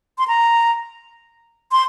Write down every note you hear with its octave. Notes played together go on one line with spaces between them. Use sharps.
C6
A#5
C6